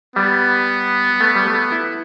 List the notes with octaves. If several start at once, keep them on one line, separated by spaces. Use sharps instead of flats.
G3 B3
A3
G3
A3
E4